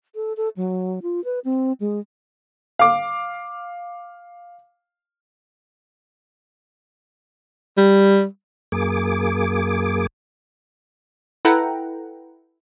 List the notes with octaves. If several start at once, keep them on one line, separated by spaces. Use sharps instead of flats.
A4
A4
F#3
F4
B4
C4
G#3
F5 D6
G3
F#2 A#3 G#4 D6
E4 A4 B4 F#5 G5 A#5